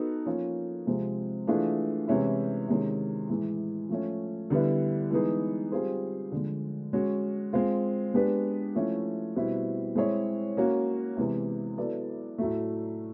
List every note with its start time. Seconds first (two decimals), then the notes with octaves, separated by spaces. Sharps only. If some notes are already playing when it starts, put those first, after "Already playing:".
Already playing: B3 D#4 F#4 A4
0.26 F3 A#3 C#4 F4
0.87 C3 F3 G#3 C4
1.47 E3 A3 D4 F4 G#4
2.08 C3 E3 G#3 C#4 E4
2.68 C3 D#3 G#3 C#4
3.29 A2 E3 G#3
3.89 F3 A3 C#4
4.50 D3 G3 B3 E4
5.11 E3 G#3 B3 D#4 G#4
5.72 G3 C4 F4 G#4 C5
6.32 D3 F3 G#3
6.93 G#3 C#4 F#4
7.53 G#3 C4 F4
8.14 G#3 B3 D4 G4 B4
8.75 F3 A3 C#4 E4
9.36 B2 G3 C4 E4
9.95 G#3 C4 E4 G#4 C#5
10.57 A#3 C#4 F#4
11.17 C3 E3 G#3 B3
11.77 F#3 B3 E4 A4 D5
12.38 A2 F#3 A3